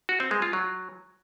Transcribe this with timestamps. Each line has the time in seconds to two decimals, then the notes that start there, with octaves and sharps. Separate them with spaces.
0.09 F#4
0.20 C4
0.31 G#3
0.42 F4
0.53 F#3